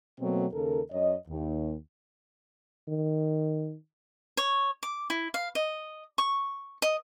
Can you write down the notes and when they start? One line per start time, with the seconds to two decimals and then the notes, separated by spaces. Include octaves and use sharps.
0.19 B2 F#3 A3 A#3 C4
0.52 D#2 C#3 A4 A#4
0.91 F#2 C#5 D#5
1.28 D#2
2.88 D#3
4.37 C#5
4.83 D6
5.10 E4
5.34 F5
5.55 D#5
6.18 C#6
6.82 D#5